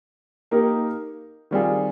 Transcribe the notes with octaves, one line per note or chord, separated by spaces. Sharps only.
A#3 D#4 G4 A#4
D#3 G3 C4 F4 G#4